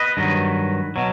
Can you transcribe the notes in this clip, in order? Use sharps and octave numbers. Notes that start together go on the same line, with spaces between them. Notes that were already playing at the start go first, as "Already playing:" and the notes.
Already playing: B4 D#5
G2 D#3 F#3
B2 F#3